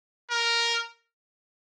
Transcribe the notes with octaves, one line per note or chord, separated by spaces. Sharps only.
A#4